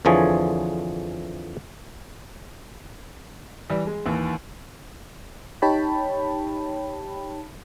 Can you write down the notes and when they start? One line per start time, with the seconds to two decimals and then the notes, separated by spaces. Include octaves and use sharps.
0.05 F2 D3 E3 F3 G#4 C#5
3.69 E3 G3
3.87 G#3
4.06 D#2 E3
5.62 D#4 G4 C#5 G5 A5 B5